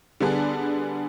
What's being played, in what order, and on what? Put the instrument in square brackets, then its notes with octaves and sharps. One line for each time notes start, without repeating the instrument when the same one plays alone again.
[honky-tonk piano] D3 G3 B3 D4 G#4